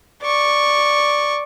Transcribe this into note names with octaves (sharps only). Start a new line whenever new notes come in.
D5 C#6